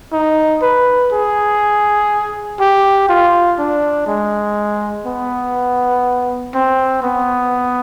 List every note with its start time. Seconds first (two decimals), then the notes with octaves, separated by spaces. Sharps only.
0.13 D#4
0.62 B4
1.12 G#4
2.60 G4
3.09 F4
3.59 D4
4.07 G#3
5.07 B3
6.55 C4
7.03 B3